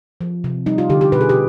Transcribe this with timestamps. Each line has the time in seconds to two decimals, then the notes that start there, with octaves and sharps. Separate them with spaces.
0.21 F3
0.44 C3
0.66 G3 D#4
0.78 F4
0.90 D3 G4
1.01 G4
1.12 B2 B4
1.21 G#4
1.29 G4